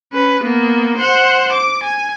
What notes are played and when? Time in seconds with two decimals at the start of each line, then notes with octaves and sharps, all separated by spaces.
0.13 C#4 B4
0.43 A#3 B3
0.98 C5 F#5
1.52 D6
1.83 G#5